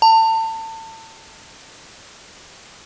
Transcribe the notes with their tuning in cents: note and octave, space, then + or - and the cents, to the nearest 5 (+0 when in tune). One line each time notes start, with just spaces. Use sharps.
A5 +30